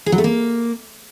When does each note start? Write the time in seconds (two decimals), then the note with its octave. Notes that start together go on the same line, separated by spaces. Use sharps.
0.06 G#4
0.12 F#3
0.18 A3
0.24 A#3